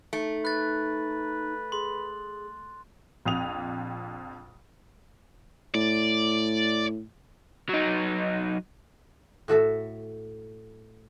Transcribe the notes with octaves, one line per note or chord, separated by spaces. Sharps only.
A3 D#4
B4 F#6 A6
G#4 C6
A#1 F2 D#6 F7
A2 D5
F#3 D#4
A2 F#4 A4 E5